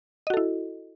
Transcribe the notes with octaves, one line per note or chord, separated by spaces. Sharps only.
E4 F#4 A4 D#5